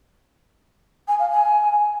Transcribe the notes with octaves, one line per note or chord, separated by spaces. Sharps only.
G#5
F5
G#5